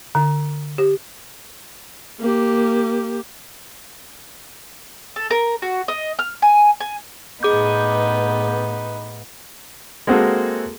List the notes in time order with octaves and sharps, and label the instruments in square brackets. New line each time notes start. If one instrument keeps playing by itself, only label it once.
[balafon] D3
G4
[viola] A#3 G4
[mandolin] A4
A#4
F#4
D#5
F6
G#5
G#5
[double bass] A2 B3 [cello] D#4 B4 [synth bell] G#4 D6 G6
[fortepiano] G#3 A#3 C4 F#4 G#4 A4